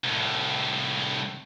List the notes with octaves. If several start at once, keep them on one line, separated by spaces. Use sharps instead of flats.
C2 A2